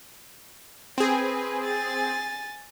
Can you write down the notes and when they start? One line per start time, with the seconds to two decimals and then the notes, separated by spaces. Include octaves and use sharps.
0.98 C4 G#4 B4 G#5
1.63 G#5 A6